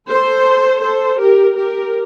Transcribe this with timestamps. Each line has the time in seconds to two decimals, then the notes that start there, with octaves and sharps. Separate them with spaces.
0.10 A4 C5
0.83 A4 C5
1.20 G4 A#4
1.57 G4 A#4